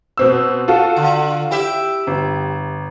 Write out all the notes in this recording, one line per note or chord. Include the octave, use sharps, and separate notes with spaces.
B2 C4 E6
F4 F#4 A4
D3
E4 G4 E5
G1